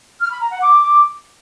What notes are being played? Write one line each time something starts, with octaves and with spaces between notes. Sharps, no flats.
F6
B5
A#5
F#5
D6